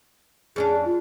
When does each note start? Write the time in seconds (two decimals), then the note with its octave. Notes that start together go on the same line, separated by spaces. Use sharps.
0.56 F2 C#4 D4 G#4
0.85 F4